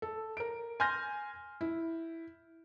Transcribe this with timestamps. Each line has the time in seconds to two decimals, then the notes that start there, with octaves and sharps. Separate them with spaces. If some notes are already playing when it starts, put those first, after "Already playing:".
0.02 A4
0.37 A#4 D7
0.80 G#5 C6 F6 G6 A#6
1.61 E4